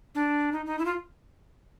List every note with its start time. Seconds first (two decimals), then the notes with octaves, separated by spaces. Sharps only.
0.15 D4
0.52 D#4
0.66 D#4
0.79 E4
0.85 F4